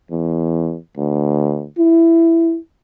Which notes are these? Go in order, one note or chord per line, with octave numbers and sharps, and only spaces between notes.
E2
D2
E4